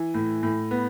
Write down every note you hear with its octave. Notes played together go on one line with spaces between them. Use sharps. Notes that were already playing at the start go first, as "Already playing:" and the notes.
Already playing: E3
A2
A2
B3